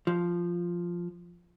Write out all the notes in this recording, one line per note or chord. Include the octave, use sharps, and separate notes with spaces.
F3